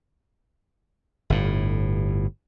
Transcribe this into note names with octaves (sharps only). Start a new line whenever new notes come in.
G1 A2